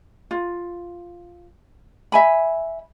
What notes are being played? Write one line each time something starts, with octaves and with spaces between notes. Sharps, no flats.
F4
E5 G#5 B5